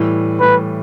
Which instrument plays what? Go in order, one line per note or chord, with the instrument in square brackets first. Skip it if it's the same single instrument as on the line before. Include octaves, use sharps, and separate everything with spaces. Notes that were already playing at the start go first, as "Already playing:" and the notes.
Already playing: [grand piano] A2 E3 G3
[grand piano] A2 E3 G3 [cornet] B4